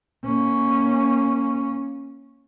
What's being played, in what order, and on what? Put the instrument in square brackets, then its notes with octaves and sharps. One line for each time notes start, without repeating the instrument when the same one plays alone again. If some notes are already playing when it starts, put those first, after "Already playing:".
[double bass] A#3 C#4